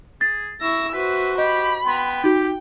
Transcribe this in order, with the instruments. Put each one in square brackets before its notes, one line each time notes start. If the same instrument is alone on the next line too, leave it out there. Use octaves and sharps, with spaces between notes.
[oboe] G#4 [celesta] A6
[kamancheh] E4 E5 [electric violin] C#6 A#6 [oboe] E6
[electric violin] F#4 C5 [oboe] B4 [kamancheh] E5
[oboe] G4 [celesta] D#5 [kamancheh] B5
[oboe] B3 [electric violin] G5 [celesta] C6
[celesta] D#4 F#4 [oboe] G4